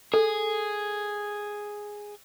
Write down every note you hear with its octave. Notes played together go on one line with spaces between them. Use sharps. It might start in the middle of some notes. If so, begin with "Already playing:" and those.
G#4 A4